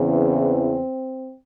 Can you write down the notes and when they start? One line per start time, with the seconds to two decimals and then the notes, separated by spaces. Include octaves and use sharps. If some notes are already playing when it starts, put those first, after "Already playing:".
Already playing: E2 C#3 E3 C4